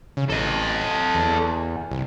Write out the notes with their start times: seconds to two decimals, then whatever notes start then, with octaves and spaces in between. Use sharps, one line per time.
0.17 C#3
0.30 A1 A4 D#5
1.15 E2
1.91 C2